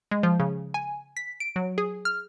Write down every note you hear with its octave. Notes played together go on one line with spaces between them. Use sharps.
G#3
F3
C#3
G#5
B6
D7
F#3
G#4
F6